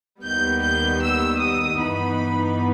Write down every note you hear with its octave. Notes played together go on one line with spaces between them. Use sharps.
D#2 D#3 G3 B3 G6
G6
E6
D#6
G2 E3 B3 D#4 B5